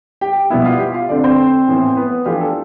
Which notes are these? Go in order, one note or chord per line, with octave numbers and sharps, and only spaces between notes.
G4 G5
B2 G3 B3 E4 E5
F4 F5
G4 G5
F4 F5
D3 A3 C4 D4 D5
C4 C5
A2 E3 B3 E4
B3 B4
E3 A3 D4 F4 G4
A4